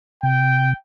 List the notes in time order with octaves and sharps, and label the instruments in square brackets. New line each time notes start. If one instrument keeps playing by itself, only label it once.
[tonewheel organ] C3 [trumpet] G5